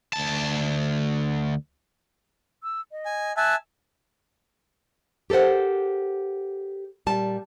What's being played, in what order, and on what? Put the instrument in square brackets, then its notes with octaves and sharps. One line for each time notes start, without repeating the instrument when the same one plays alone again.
[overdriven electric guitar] D2 A5
[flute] E6
D#5
[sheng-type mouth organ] G#5
[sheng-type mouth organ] E5 G#5 A5 [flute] F#6
[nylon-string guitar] G4 A4 A#4 C5 F#5
A#2 G3 A5